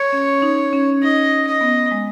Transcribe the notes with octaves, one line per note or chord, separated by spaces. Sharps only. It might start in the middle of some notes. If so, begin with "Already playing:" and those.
Already playing: C#5
C#4
D#4
C#4
D#4 D#5
D#5
B3
G#3